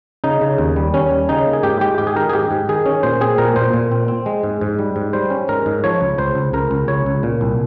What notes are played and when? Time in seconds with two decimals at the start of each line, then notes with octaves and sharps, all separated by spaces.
0.24 C#3 D#4
0.41 C#3
0.58 D#2
0.76 G3
0.94 D#2 C#4
1.11 G3
1.29 C#3 D#4
1.46 A#3
1.53 G#4
1.63 G#2 G4
1.80 G#3 G4
1.98 G#2 G4
2.07 G#4
2.16 D#3 A#4
2.29 G#4
2.33 G#2 G4
2.51 G#2
2.69 D#3 G#4
2.86 C#4
3.03 A#2 C5
3.21 C4 G#4
3.38 A#2 A#4
3.56 A#2 C5
3.73 A#2
3.91 C4
4.08 C4
4.26 G#3
4.43 G#2
4.61 G#2
4.79 G3
4.96 G#2
5.13 G3 C5
5.30 C#4
5.48 G#2 A#4
5.66 G#2
5.84 F3 C#5
6.01 C#2
6.18 C#2 C5
6.35 C#2
6.53 C#2 A#4
6.71 C#2
6.88 C#2 C#5
7.06 C#2
7.23 A#2
7.41 C2